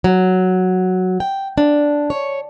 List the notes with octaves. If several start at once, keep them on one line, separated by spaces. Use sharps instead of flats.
F#3
G5
D4
C#5